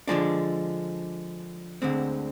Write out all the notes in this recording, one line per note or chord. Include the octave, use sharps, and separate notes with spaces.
D3 F3 G#3 D4
D2 D3 G#3 C4